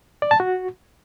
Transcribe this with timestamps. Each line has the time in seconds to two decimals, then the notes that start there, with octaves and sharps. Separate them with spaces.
0.22 D5
0.31 A5
0.40 F#4